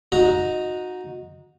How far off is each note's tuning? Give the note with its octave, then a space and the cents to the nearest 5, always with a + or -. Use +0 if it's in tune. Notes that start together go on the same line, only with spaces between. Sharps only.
D#4 +0 F#4 -20 A#5 +0